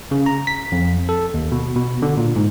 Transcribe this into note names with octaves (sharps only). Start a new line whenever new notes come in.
C#3
A#5
B6
F2
A4
D#2
B2
B2
D3
A#2
G#2